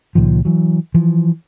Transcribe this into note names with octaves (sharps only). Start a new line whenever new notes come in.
C#2 A#2 D#3 F3
E3 F#3
E3 F3